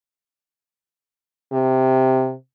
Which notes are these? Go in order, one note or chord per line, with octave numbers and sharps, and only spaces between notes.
C3